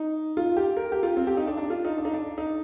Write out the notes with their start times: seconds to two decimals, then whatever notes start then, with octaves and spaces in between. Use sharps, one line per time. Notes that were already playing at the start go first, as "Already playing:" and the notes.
Already playing: D#4
0.37 F4
0.57 G4
0.77 A#4
0.92 G4
1.03 F4
1.17 C4
1.27 G4
1.37 D#4
1.47 D4
1.57 D4
1.70 F4
1.85 D#4
1.97 D4
2.05 D#4
2.14 D4
2.38 D#4